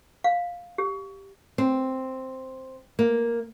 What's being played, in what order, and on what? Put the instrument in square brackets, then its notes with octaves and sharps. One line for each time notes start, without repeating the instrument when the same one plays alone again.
[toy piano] F5
G4
[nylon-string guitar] C4
A#3